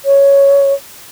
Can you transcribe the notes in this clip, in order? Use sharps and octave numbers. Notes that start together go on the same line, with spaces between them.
C#5